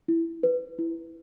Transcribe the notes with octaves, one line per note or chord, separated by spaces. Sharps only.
E4
B4
E4